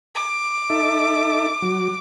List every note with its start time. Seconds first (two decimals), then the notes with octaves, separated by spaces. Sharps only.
0.15 D6
0.70 D#4 A4 E5
1.62 F#3